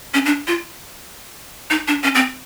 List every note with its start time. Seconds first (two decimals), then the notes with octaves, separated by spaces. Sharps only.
0.14 C#4
0.25 D4
0.47 F4
1.70 D#4
1.88 D4
2.04 C#4
2.15 C4